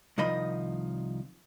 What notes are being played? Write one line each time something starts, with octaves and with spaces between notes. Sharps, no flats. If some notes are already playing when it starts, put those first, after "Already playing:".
C2 D#3 F3 D#5 B5